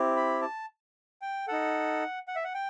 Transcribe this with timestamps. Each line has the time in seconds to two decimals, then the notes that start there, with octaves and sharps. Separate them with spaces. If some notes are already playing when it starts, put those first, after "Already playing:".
Already playing: C4 E4 G4
0.17 B5
0.42 A5
1.22 G5
1.48 D#4 A4 F#5
2.28 F#5
2.36 E5
2.44 F#5
2.54 G5